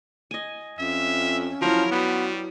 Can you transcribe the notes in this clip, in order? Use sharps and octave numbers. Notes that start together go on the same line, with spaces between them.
D#5 G#5
F2 C#4 E5
F3 F#3 E4 A#4
G3 B3 F#4